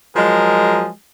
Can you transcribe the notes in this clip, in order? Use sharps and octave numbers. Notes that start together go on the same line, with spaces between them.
F3 F#3 G#3 G#4 A#4